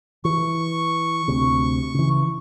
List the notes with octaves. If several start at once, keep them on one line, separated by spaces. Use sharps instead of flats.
E3 C#6
D2 C3
C#3 E3